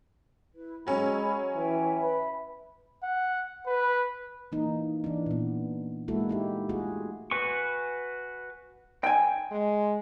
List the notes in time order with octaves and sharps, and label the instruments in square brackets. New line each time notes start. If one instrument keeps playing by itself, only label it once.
[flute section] E4 B4
[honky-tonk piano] F#3 C#4 [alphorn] G#3 [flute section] G#4 A4 B5
[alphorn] E3 [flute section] E5 G5 G#5
[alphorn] B4 [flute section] E5 B5
[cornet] F#5
B4
[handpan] E3 A#3 D#4
E3 D4
A#2 B3
G#3 A#3 E4 F#4 A4
D#4 E4 G4
A3 F4 F#4 G#4
[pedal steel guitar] F#4 B4 G#5 C#6
[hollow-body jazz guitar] G5 G#5
[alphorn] G#3